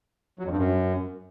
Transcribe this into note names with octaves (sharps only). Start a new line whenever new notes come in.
F#3
F2
G2
F#2